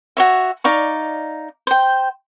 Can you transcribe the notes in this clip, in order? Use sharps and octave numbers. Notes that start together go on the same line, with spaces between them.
F#4 C#5 E5
D#4 D5 F5 C#6
C5 G5